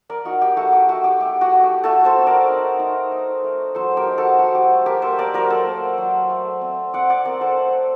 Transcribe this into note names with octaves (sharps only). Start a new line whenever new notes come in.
A#4 D5
D#4 F#4
G4
A3 F#4 A4
G4
A3 F#4
G4
A3 G4
F#4
A3
G4
A3 F#4 A4
A4 C5
C4
A#4 D5
D#4
D#4
D#4
A3
F#3 A4 C5
G4 A#4
D#4
F#4 A4
F#3 F#4
G4
A3
G4 A#4
A#3 A4 C5
A#4 D5
F#3 A#4 D5
A4 C5
A#3
F#3
A3
C4
C4 D5 F#5
D5 F#5
C4 A#4 D5
A4 C5
A3